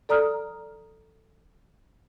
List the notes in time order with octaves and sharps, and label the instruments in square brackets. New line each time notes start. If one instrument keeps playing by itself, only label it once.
[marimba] A4 D5 A#5 D#6 F6